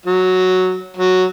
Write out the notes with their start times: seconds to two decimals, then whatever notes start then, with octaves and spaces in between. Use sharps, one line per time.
0.06 F#3
0.97 F#3